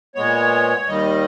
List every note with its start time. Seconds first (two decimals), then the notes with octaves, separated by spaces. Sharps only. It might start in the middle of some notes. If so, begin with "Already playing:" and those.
0.15 A#2 G#3 B3 C#5
0.87 D#2 D#3 G3 D#5